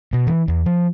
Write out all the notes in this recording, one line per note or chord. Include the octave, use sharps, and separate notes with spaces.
B2
E3
E2
F3